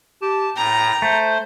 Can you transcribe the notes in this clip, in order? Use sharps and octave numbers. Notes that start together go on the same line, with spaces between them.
G4 A5
A2 G5 A#5
A3 C5